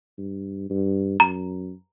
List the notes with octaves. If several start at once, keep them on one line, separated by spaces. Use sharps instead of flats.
G2
G2
F#2 A#5